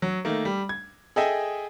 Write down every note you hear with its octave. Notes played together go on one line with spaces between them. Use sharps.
F#3
D#3 A3 A#3
G3
G#6
G#4 A4 D#5 E5 G5 G#5